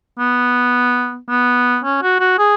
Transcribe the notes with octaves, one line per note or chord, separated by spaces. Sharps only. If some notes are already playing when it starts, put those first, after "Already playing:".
B3
B3
C#4
F#4
F#4
G#4